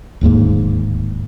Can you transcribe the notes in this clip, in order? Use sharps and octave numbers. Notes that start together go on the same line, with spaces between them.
D1 D#2 G#2 A#3